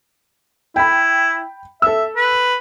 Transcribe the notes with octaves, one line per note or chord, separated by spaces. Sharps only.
E4 G5 B5
A4 E5 E6
B4